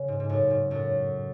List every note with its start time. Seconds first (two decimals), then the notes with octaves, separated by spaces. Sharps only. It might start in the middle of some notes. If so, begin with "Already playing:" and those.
Already playing: C#3
0.08 G#2
0.20 G#2
0.29 F#2 A2
0.51 G#2
0.70 F#2 A2